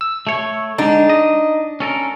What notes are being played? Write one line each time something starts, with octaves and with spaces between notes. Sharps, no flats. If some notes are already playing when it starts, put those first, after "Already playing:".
E6
A3 C#5
D3 G#3 D4 D#4
D#5
C#4 A4 A#4